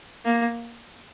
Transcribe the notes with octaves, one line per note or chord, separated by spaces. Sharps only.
A#3